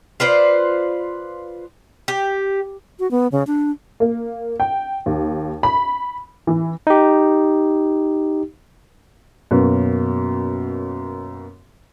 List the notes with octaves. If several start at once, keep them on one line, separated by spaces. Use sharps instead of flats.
F4 B4 C5 D5
G4
F#4
B3
C#3
D4
A#3
G5
D#2
B5
E3
D#4 G4
F#2 B2 A#3 C#4